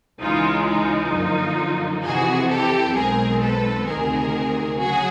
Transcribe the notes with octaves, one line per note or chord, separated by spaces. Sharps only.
C#2 C#3 E3 G#3 D#4 F4
D#4 F4
F#2 D3 F3 A#3
F2 C3 E3 F#4 G#4
G4 A4
B1 B2 G#3 C4 G#4 A#4
A4 B4
D2 C3 D#3 G#4 A#4
C#3 F#3 F#4 G#4